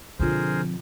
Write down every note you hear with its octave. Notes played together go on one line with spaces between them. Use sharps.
B2 D3 F3 C4 F4 G#4 A#4 C5